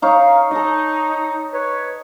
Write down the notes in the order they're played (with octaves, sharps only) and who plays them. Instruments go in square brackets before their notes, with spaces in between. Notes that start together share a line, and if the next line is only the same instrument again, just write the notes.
[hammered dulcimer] D#4 C#5 [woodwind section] F5
[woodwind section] D#4 [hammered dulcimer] A4 D#5
[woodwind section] B4 C#5